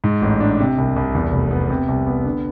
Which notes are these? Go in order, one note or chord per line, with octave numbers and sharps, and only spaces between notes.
G#2
A1
D4
C3
C2
C2
E2
F1
B3
C3
C2
B3
D3